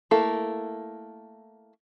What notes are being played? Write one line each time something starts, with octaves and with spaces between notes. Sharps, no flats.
A3 A#3 E4 A4